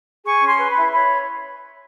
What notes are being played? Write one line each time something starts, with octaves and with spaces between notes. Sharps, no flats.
G#4 C#6
C#4
C6
B4
B5
E4
C#5 B5